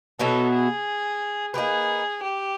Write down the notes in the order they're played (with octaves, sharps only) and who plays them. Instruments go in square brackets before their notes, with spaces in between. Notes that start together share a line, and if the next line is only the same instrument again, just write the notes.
[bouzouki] B2 F#3 B3 E4 [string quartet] A4
[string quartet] G#4
[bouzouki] A#3 D#4 G4 B4 [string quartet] G#4
[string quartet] G4